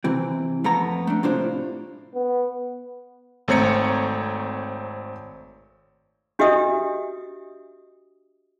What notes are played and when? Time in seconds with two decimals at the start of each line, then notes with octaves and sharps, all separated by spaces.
0.04 C3 E3 C4
0.64 F2 A3 B3 A#5
1.07 A3 D4
1.23 A2 C3 D4 F4 C5
2.15 B3
3.48 G#1 A3 C4 C#5 A#5 C#7
6.39 D4 F#4 G4 D#5 E5 D#6